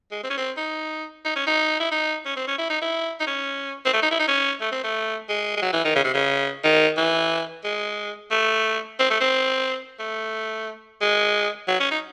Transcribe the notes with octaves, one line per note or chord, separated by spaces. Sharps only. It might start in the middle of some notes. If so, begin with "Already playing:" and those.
G#3
C4
C#4
C4
D#4
D#4
C#4
D#4
E4
D#4
C#4
C4
C#4
E4
D#4
E4
D#4
C#4
C4
A3
D#4
E4
D#4
C#4
A3
C4
A3
G#3
G#3
F#3
E3
D#3
C#3
C3
C#3
D#3
E3
G#3
A3
C4
A3
C4
A3
G#3
F#3
C#4
D#4